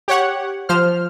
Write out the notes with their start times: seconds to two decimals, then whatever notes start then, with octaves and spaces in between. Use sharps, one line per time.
0.08 G4 C#5 F#5
0.69 F3 C5 F6